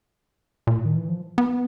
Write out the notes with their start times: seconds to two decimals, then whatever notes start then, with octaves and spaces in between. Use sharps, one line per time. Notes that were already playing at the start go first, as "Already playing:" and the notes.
0.67 A#2
0.76 A2
0.85 D#3
0.95 E3
1.09 F3
1.38 B3